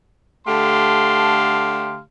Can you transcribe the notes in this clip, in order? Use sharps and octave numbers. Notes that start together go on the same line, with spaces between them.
D3 A3 G4 F5 A5 C6